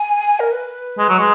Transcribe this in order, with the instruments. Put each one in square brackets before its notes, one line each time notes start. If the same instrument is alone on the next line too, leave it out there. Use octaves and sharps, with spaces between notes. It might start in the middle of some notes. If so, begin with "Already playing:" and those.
Already playing: [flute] G#5
A#4
B4
[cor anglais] G#3
F#3
G#3